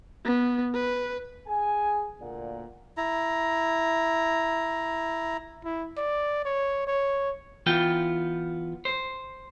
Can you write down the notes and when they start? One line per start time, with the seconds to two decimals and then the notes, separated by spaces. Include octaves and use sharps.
0.25 B3
0.74 B4
1.46 G#4 G#5
2.20 D2 A#2 A#3 D5 F#5
2.97 E4 A#5
5.65 E4
5.97 D5
6.45 C#5
6.87 C#5
7.66 E3 B3 F4 G5
8.85 C5